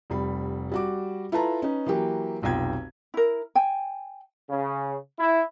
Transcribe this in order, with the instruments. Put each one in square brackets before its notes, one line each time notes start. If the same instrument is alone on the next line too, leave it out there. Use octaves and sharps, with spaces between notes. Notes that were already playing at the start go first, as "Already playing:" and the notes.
[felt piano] F1 G3 B5
G3 F#4 D6
E4 F4 A4 B4 A5 A#5
C#4 D#4 B4
E3 F#3 A#3 G4
F1 B1 F4 G5 G#6
[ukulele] E4 A#4
G5 G#5
[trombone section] C#3
E4